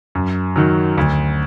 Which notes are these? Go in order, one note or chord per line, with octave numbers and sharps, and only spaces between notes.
F#2
D#3 F#3
D2